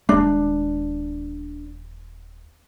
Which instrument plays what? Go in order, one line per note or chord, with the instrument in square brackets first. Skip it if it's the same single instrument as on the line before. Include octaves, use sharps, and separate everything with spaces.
[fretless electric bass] D#1 G#3 [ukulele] D4